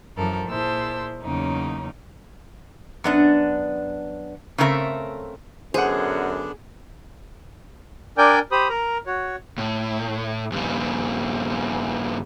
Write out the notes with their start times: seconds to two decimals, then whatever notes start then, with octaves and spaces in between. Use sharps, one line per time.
0.16 F#2 E3 F3 A4 A#4
0.47 A#2 E4 G#4 C5 A5 E6
1.22 E2 C#3 F#3 A#3 C#4 D#4
3.04 F#2 B3 D4
4.58 C#3 A3 C4 A#4 B4 E5
5.74 F#2 D3 B3 D4 G#4 C5 F#5
8.18 D4 A#4 D5 G5 G#5 G6
8.52 G4 C5 B5 D#6
8.69 A#4 A#5
9.06 F#4 C#5
9.58 A2
10.52 G2 C#3